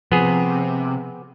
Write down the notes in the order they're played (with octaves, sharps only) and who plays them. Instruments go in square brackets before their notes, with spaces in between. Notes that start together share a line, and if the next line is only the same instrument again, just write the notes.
[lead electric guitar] C3 [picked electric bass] F3 [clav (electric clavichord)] B3 G#4